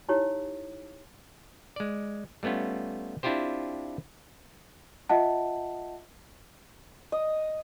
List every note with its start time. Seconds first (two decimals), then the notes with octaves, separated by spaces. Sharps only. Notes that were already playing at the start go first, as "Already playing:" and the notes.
0.09 D#4 E4 G4 C#5
1.76 G#3 D5
2.43 G3 A3 B3 C#4 F4
3.23 C4 D4 E4 F4 G4 C5
5.09 F4 D#5 E5 F#5 A5
7.12 D#5